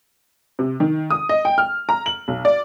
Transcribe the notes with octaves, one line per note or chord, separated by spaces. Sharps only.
C3
D#3
D#6
D#5
G5
F6
A#5
F#7
B1
D5